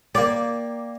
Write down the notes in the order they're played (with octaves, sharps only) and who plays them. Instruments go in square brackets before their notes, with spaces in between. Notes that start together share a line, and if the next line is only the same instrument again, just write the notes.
[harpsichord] A#3 G4 [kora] D5